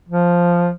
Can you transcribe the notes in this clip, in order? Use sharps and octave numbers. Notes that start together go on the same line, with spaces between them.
F3